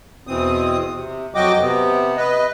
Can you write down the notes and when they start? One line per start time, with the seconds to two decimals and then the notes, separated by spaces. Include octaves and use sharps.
0.27 E2 B2 E3 C4 D#6
0.94 C3
1.35 F2 F#3 F#4 D#5 G5 D6
1.60 C3 B3
2.17 B4 D#5